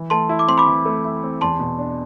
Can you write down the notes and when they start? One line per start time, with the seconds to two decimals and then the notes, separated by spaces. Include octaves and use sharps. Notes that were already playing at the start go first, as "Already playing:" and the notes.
Already playing: E3
0.10 A3 A5 C6
0.29 E4
0.39 D6
0.48 C4 C6
0.58 B5 D6
0.67 E3
0.85 A3
1.05 E4
1.23 C4
1.41 E2 A5 C6
1.60 B2
1.79 D4